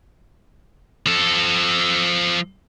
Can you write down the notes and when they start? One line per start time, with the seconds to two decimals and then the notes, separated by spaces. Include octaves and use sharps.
1.06 F3 A4